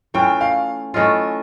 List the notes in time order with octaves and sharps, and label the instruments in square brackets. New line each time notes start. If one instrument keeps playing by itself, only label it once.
[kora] E3 A3 C#4 F4 [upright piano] G5
[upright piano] F5
[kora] E3 A3 C#4 F4 [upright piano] D#5